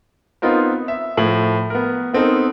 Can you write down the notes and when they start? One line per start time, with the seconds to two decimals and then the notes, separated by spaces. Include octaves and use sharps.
0.42 B3 C4 D#4 F4 A#4 C5
0.88 E5
1.17 A2 F3 F#7
1.70 B3 A#4
2.14 B3 C4 D#4 A4 A#4